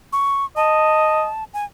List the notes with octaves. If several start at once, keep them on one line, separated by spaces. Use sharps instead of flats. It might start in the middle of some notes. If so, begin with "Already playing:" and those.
C#6
D#5 A5
G#5